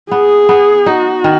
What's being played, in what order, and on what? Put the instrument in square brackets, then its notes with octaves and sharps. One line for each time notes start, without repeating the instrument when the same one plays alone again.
[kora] B3 [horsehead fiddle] G#4
[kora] B3
[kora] D#4 [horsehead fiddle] F#4
[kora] D#3